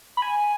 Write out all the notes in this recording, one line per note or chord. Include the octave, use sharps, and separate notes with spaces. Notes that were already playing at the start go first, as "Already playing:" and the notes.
B5
G#5